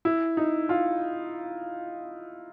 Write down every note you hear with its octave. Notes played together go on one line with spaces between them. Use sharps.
E4
D#4
F4